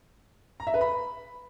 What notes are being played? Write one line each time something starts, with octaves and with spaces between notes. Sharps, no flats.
A#5
E5
B4
B5